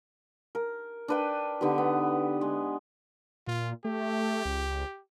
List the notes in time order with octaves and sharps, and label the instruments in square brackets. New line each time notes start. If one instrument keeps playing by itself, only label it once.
[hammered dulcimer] A#4
D4 B4 G5
D3 B3 D#4 G4
B3
G#3
[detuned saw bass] A#2 [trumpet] F4
[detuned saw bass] A3 [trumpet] G4
[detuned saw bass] C#2